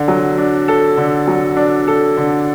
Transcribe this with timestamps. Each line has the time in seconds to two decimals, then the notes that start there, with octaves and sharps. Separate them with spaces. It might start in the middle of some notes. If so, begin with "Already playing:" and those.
Already playing: D3
0.08 F#3
0.38 D4
0.68 A4
0.97 D3
1.28 F#3
1.57 D4
1.88 A4
2.17 D3